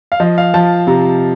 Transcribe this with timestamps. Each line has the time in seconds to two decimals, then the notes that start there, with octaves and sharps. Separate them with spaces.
0.12 F5
0.20 F3 D#5
0.38 F5
0.54 F3 A5
0.87 C3 A#5